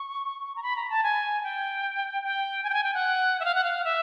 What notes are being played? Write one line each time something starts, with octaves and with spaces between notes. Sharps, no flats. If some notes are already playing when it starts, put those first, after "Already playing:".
Already playing: C#6
A#5
B5
A#5
A5
G#5
G5
G5
G#5
G5
G#5
G5
F#5
E5
F5
F#5
F5
E5